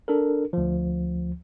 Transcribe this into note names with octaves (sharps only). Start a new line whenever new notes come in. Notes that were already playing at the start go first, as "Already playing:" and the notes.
D4 A4 A#4
D2 F3